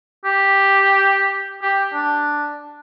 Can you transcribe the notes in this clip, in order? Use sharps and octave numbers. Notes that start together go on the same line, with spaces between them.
G4
G4
D4